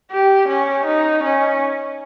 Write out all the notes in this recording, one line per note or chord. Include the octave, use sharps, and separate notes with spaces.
G4
C#4
D#4
C#4